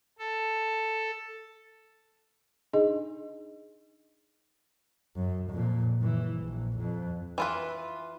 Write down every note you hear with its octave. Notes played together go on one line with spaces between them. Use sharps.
A4
D4 D#4 G#4 D#5
F#2
F2 A#2
F#1 E3
A#1
F2
E3 F4 B4